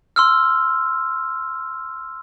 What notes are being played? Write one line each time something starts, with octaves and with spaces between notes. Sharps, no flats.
C6 E6 F6